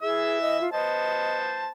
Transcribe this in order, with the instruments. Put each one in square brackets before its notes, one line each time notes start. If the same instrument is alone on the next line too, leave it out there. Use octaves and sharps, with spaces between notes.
[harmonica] E3 E5 E6 [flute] G#4
[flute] D#5
F4
[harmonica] B3 C5 A5 [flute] D#5